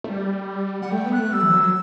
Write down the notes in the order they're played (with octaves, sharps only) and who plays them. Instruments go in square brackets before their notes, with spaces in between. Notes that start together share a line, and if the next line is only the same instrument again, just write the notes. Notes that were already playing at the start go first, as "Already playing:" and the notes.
[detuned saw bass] A3
G3
[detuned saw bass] G3 [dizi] F#5
[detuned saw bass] A3 [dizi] G5
[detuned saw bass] B3
[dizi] F#6
[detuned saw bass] A3
[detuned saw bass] G3 [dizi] E6
[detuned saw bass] E3
F#3